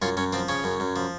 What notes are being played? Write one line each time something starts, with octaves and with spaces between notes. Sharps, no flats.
F#2 C#4 F4
F#2 C#4
F3 C4
C#3 C#4
F#2
F#2
F3